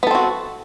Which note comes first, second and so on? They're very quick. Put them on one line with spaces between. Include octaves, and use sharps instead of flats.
B3 A4 C4 F#4